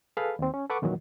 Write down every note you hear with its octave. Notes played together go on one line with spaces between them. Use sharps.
G#4 A4 B4 F5 B5
D#2 C4
C#4
A4 B4 F#5 C#6 D6
F2 A#2 D#3 E3 F#3